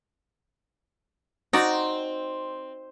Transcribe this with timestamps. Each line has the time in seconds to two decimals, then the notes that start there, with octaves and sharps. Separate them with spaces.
1.53 C4 D#4 F#4 D5